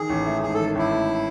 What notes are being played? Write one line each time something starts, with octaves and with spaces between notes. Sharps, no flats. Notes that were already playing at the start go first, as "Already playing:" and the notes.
Already playing: D#3 G#4
A1
A3
G#2 G#4
A4
D#3
A1 E4
A3